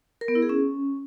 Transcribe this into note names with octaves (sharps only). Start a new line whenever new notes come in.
A#4
B3
E4
G#4
C#4